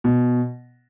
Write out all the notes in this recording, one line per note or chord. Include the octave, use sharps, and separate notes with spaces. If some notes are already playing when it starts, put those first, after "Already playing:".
B2